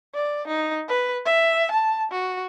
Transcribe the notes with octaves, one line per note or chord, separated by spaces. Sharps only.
D5
D#4
B4
E5
A5
F#4